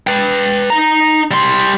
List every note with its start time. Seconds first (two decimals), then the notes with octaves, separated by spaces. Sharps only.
0.07 B4 G5
0.70 D#4 A#5
1.31 G3 C6